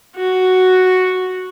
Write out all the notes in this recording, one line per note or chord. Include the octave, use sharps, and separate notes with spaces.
F#4